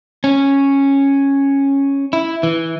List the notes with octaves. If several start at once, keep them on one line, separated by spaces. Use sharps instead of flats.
C#4
E4
E3